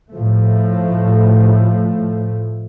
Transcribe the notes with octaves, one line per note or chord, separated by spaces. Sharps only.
A2 F3 A3